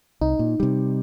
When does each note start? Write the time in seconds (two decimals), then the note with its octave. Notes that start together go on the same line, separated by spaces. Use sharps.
0.21 C2 D#4
0.39 A#2
0.60 C3 G3